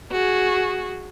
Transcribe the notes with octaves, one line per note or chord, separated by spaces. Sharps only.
F#4 G#4